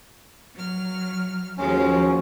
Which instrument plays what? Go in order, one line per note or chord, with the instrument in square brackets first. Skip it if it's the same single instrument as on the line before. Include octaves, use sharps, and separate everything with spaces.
[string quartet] F#3 F6
[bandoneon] D#2 C#4 [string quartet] F3 F#3 G#3